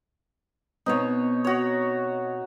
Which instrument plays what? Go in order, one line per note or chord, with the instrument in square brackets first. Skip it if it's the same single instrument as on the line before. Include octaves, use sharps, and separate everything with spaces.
[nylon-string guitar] B2 B3 C4 [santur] D#4 C#5
[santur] F#4 C#5